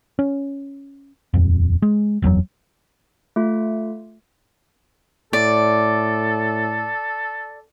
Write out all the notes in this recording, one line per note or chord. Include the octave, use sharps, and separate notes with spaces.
C#4
D#1 F2
G#3
F#1 E2 C3 F#3
A3 F4
A2 A4 D5